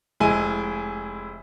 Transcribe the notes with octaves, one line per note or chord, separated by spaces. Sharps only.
F1 G#3 E4 G#5 D#7